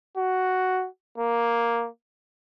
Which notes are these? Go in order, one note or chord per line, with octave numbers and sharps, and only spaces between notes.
F#4
A#3